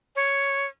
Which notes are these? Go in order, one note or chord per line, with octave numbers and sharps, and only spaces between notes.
C#5